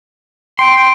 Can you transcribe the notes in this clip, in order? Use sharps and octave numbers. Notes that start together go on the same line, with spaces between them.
G5 C6